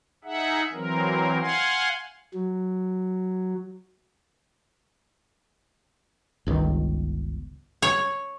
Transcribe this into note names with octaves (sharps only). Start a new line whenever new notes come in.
D#4 G#4 E5 F#5
E3 F#3 C4 A#4
F5 F#5 G#5 C6
F#3
G1 C#2 D#3
C#5